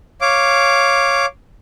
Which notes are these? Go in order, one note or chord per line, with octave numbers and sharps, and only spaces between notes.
C#5 F5 D6